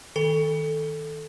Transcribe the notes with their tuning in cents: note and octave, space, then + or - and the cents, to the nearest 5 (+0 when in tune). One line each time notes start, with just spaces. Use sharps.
D#3 +10 A4 +0